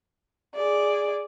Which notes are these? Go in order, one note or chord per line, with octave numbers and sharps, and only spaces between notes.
G#4 D5